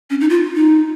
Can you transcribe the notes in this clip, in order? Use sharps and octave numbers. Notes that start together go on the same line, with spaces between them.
C#4
D#4
F4
D#4